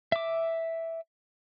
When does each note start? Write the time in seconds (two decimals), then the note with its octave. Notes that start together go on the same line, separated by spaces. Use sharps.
0.12 E5 D6